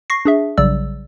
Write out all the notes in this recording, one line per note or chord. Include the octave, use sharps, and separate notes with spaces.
C#6 A#6 C7
D4 G#4 E5
A#1 C#3 F#3 G3 D5 E6